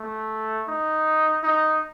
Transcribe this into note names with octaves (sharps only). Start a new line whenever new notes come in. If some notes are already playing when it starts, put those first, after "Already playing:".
Already playing: A3
D#4
D#4